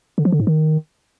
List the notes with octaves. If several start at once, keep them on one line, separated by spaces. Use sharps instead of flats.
D3
F3
D3
G#2
D#3